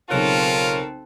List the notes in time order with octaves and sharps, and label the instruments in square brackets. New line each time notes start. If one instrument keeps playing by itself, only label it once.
[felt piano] B1 C#3 F#6 [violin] C4 A4 [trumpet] F4 [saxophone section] A#4 C#5